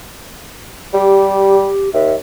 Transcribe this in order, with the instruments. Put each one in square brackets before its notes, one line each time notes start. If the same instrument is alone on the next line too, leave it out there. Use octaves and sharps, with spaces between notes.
[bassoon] G3 [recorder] G4
[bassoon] D#2 [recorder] E5